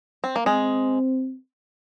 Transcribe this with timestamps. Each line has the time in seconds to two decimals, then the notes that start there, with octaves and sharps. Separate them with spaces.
0.24 C4
0.36 A#3
0.46 G#3 C4